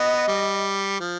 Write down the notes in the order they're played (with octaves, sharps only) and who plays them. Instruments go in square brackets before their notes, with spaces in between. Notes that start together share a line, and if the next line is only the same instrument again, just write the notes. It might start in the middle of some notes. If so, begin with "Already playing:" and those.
Already playing: [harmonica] B3 [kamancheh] D#5
[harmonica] G3
F3